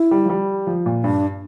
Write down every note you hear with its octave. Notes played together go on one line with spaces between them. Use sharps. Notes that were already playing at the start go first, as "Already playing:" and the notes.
Already playing: E4
G3
F3
G3
F3
A#2
G2 D4